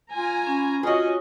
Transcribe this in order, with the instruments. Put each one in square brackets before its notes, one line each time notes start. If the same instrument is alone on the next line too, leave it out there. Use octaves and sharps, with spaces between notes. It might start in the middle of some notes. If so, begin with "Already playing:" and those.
[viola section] F4 G#5 A#5
[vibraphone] C#4 B5
[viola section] C#4 D#5 [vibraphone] F4 [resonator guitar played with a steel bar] F#4 G#4